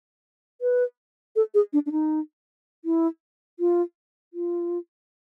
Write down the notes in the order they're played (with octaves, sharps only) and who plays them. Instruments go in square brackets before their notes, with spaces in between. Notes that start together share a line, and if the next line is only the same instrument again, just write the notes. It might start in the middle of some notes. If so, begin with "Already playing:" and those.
[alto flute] B4
A4
G#4
D4
D4
D#4
E4
F4
F4